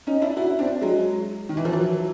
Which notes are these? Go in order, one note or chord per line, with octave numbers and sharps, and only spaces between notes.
C#4 D#4
D4 E4
E4 F#4
C4 D4
F#3 G#3
D#3
E3
F3
E3 F#3